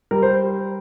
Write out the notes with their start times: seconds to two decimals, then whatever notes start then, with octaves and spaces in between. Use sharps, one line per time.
0.11 G3 A#4
0.22 C5